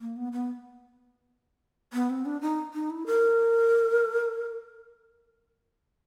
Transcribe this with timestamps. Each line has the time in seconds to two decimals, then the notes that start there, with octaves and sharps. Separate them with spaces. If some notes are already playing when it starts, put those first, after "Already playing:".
0.01 A#3
0.16 B3
0.32 B3
1.93 B3
2.10 C4
2.25 D4
2.41 D#4
2.73 D#4
2.90 E4
3.06 A#4